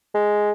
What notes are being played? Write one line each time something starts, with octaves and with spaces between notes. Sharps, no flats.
G#3